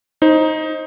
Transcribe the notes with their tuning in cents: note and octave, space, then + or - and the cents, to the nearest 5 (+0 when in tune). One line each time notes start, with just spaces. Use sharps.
D#4 +10 C5 +25